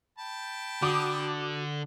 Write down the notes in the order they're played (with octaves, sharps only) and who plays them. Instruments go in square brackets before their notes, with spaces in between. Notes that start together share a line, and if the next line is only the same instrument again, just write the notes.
[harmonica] G5 A5 B5
[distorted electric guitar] D3 [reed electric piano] F#4 [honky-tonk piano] D6 D#6